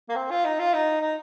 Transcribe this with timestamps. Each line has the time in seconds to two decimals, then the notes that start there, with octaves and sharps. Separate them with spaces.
0.09 A#3
0.16 C4
0.31 F4
0.45 D#4
0.59 F4
0.74 D#4
1.01 D#4